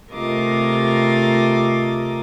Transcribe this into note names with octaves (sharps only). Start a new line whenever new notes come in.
C3 A3 F4 A#4 D#5 D6